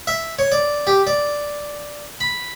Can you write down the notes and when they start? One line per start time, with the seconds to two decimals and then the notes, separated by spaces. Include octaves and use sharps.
0.07 E5
0.39 C#5
0.52 D5
0.87 G4
1.07 D5
2.20 B5